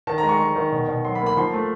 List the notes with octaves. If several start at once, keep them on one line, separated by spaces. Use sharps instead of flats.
D#3 A5
G#3 A#5
C#6
G#3
D#3
B2
B2
F#3 C6
B5
A#3
B5
F3 C6
A3